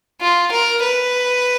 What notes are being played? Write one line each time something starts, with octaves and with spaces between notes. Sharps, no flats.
F4
A#4
B4